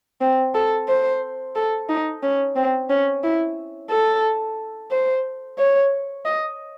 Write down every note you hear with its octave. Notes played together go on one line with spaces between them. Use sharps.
C4
A4
C5
A4
D#4
C#4
C4
C#4
E4
A4
C5
C#5
D#5